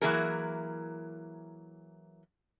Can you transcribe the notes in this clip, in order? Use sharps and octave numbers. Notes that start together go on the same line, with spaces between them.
E3 F#3 A#3 E4 G#4 A#4